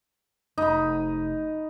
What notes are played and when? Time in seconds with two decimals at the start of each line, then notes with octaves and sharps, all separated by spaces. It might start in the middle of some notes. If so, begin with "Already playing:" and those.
0.58 F1 D#4 B5